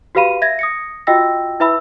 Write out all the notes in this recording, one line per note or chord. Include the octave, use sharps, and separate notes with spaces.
F#4 G4 B4 F5 B5 D#7
E5 G#6 A#6
D#6 A#6 C#7
F4 F#4 D#5 G5 E6 A#6
E4 B4 E5 B5 E6